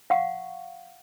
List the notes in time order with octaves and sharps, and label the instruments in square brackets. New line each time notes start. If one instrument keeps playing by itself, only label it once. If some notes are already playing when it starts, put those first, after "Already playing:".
[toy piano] F5 F#5 C#6